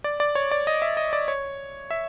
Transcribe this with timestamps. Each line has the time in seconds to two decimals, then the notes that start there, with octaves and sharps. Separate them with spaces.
0.04 D5
0.20 D5
0.35 C#5
0.51 D5
0.67 D#5
0.82 E5
0.97 D#5
1.13 D5
1.28 C#5
1.91 E5